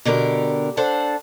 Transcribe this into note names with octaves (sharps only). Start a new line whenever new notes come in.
B2 D3 G4 A#4
D4 A4 C5 F#5